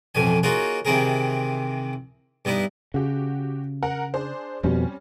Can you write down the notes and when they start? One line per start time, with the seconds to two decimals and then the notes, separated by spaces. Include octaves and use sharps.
0.15 A1 F2 B2 G#5
0.43 A#3 D#4 F4 F#4 G#4 C#5
0.85 C3 D#3 E3 C4 G#4 A#4
2.45 G2 B3 D#4 E4
2.94 C#3 F#4 G4
3.83 A#4 F#5
4.14 D4 G#4 C5
4.63 F2 B2 G3 C4 C#4